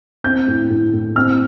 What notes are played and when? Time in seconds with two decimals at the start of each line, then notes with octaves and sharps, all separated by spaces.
0.24 C4 G6
0.48 A2
0.70 A2
0.94 A2
1.16 C4 F6